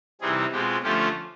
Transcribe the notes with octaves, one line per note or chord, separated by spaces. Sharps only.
C3 E3 G3 C4 D#4 G#4
B2 G#3 C4 F4 G4
D3 F3 A3 C#4 F4 G4